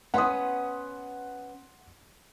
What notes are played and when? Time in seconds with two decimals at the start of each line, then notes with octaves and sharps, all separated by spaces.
0.14 B3 C#4 F#5 C6 D#6